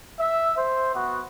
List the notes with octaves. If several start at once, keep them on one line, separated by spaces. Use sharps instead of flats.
E5
C5
B3 F#4